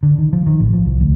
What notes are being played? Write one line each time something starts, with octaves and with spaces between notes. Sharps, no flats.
D3
D#3
F3
D#3
A1
F3
C2
D2